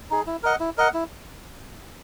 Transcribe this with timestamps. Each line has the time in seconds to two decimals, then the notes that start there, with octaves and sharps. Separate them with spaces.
0.11 D#4 G#4
0.27 E4
0.43 A#4 D#5 F#5
0.60 E4
0.78 A#4 D#5 F#5
0.94 E4